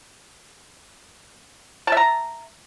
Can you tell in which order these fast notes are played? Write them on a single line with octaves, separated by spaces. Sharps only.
A5 E5 A#5